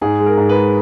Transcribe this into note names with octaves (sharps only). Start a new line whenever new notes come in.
G#2 G#4
G#3
A#4
G#2
B4
G#3